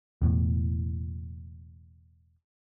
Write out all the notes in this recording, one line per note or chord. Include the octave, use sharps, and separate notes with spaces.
E1 E2 A2